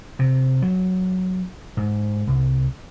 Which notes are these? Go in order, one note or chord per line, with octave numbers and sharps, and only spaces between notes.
C3
F#3
G#2
C2